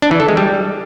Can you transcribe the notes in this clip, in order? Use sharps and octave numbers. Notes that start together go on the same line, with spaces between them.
D4
E3
A4
G#3
G3